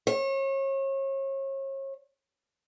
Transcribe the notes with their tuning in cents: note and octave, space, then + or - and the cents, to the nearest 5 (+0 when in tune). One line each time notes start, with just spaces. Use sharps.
C#5 -35